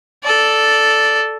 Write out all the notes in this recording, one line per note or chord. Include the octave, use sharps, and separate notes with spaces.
A4 D5